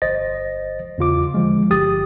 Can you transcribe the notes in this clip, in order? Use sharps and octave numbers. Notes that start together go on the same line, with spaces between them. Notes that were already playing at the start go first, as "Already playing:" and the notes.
G1 C5 D#5 A6 A#6
E2 C#3 F4 D6
D3 F3 G#3
G1 G4 D#6 A6